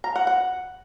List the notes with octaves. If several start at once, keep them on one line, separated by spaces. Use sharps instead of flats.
A#5
F#5
F#5